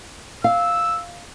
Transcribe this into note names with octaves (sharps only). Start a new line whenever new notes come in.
F5 E6